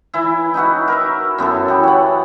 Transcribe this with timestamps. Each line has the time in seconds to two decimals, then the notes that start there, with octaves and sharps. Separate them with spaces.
0.14 E3 E4
0.54 D#4 E4 F#4 B4
0.88 A#4 B4 E5
1.38 F#2 B3 E4 A4
1.68 E3 G4
1.83 C#5 F#5